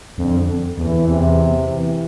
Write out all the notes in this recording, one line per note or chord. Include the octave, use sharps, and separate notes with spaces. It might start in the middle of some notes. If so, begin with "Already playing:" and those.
F2 D3
E2 E3
E2 C3
E3